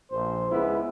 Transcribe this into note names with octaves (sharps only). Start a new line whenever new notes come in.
A#1 C5
C#2 G#3 B3 E4